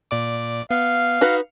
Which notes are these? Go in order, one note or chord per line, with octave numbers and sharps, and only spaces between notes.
A#2 D5 D6
B3 F5
D#4 F#4 B4